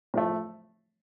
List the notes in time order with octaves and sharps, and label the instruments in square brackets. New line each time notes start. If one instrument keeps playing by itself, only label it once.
[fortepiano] A2 F3 A3